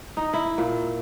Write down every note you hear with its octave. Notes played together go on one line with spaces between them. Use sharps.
D#4
E4
A#2